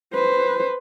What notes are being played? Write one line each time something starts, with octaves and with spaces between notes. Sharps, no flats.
B4 C5